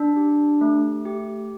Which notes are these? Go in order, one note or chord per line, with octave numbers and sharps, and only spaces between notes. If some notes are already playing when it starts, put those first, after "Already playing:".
Already playing: D4
G4
A3
G4